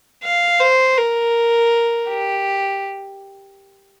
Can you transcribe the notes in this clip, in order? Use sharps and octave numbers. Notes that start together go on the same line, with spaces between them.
F5
C5
A#4
G4